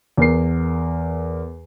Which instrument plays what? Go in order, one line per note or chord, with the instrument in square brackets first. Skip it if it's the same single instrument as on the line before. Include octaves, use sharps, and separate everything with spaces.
[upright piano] E2 A#4 C7